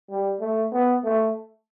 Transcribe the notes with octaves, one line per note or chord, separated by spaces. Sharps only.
G3
A3
B3
A3